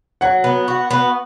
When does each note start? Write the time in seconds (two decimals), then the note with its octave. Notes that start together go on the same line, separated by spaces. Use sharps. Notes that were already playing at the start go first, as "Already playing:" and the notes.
0.21 F#3 F#5
0.44 B3
0.68 F#4
0.91 B3